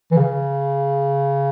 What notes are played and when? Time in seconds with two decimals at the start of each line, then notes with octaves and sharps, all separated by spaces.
0.11 E3
0.17 C#3